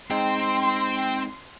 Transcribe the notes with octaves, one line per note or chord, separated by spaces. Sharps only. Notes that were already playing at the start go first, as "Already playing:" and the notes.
G#3 C4 D#4 G5 C6